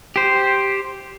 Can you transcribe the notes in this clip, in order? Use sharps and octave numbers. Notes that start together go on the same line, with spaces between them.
G4 C5